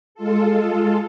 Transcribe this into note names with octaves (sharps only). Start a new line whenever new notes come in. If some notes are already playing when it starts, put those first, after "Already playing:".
G#3 F4 A4